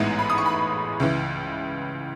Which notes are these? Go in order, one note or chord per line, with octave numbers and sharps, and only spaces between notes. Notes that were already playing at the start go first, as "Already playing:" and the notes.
Already playing: A1 G#2 E3 G#3 B3
B5
D#6
C#6
B5
C#2 C#3 E3